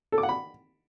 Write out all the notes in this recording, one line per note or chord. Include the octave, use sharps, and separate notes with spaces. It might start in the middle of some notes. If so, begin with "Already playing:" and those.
A4
D6
F#5
B5